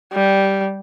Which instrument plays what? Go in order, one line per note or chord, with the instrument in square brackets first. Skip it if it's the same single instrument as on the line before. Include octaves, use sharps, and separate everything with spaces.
[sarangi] G3